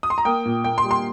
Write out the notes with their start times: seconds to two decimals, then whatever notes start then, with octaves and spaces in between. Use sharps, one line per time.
0.03 D#6
0.10 C6
0.18 A#5
0.25 A#3 G5
0.45 A#2
0.64 A#3 G5
0.78 C6
0.85 G3
0.91 C6